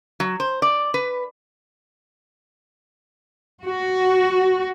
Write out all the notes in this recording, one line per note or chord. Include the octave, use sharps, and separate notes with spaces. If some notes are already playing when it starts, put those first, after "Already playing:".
F#3
C5
D5
B4
F#4